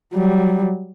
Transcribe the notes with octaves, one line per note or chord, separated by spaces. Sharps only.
F#3 G3